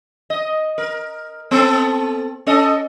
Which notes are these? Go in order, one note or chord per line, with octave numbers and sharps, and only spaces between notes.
D#5
A#4
B3 C4 A4
C#4 A4 D#5